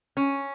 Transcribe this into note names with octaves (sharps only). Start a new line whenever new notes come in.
C#4